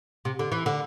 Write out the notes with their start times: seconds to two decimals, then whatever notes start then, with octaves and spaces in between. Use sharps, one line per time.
0.25 C3
0.39 D3
0.52 E3
0.66 D3